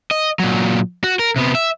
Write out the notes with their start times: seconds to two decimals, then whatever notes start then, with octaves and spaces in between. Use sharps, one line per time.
0.11 D#5
0.39 A#2 F#3
1.04 F#4
1.19 A#4
1.36 C3 B3
1.55 E5